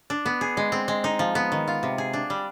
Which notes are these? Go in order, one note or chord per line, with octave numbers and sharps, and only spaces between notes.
D4
B3
G#4
G#3
C4
G#3
D#4
F3
B3
D#3
F4
C3
G#4
D4
G3